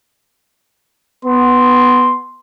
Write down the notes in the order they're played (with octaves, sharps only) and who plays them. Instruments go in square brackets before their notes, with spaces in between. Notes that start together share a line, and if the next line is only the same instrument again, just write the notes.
[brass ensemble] B3 [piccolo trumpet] C6